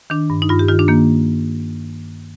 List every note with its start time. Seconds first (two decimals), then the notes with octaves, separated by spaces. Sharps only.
0.10 D#3 D4
0.30 G2
0.42 D#4
0.49 G2 F4
0.59 G4
0.68 D#3 F4
0.79 D4
0.88 D#3 A#3